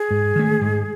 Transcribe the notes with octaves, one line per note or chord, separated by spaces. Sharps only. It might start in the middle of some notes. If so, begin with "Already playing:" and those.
Already playing: G#4
G#2
D#3 A3
G#2